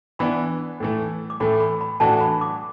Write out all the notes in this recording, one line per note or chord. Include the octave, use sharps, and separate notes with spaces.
E3 B3 D4 B5
A2 E3 A3
D6
A2 E3 A3 B5
B5
B5
A2 E3 D4 F#4 A5
B5
D6